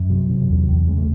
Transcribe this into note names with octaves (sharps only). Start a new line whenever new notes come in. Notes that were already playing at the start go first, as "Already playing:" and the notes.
Already playing: F#2
C3 F#3
C3
E2
E2
C#3 G#3
A3